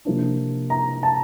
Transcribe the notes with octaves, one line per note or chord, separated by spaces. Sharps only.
C3 F3 A#3 D4
A#5
A5